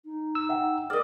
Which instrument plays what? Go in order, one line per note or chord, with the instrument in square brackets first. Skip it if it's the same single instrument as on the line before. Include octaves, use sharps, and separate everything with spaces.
[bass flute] D#4
[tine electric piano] E6
[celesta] E5 F#5 G5
[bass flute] G#4 [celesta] A#4 F6 [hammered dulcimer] D5 D#5